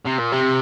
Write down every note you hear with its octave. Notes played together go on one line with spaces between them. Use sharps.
C3
A#2
C3